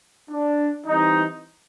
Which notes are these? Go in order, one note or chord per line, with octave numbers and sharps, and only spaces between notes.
D4
E3 G3 C4 D#4